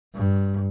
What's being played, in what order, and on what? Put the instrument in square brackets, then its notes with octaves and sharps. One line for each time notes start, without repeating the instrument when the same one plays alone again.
[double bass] G2